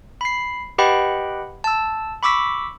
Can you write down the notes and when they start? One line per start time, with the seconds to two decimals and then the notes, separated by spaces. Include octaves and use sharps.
0.21 B5 C7
0.78 G4 B4 D#5 F#5 G5 B5
1.64 A5 E6
2.23 B5 C#6 D6 E6 B6